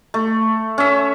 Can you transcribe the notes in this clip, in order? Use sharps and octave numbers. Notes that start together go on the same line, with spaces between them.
A3
C#4 E5